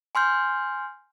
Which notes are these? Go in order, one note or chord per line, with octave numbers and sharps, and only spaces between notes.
G#5 C6 F6 G6